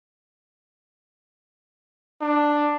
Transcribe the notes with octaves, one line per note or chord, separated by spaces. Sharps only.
D4